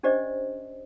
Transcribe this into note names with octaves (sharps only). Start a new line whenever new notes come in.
C#4 D4 G4 C5 D5 D#5